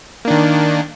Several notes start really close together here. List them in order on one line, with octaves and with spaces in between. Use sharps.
A#3 D4 D#3